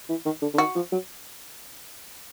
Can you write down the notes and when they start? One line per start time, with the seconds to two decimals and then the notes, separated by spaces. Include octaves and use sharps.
0.09 E3
0.25 D#3
0.42 D3
0.54 D3
0.58 D#3 F#4
0.75 F3
0.92 F#3